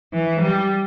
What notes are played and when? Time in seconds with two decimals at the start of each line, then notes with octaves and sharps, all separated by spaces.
0.13 E3
0.41 G3